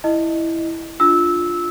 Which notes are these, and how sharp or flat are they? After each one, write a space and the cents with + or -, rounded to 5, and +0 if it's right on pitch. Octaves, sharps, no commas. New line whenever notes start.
E4 +0 D#5 -15
D4 +0 F4 +0 E6 -15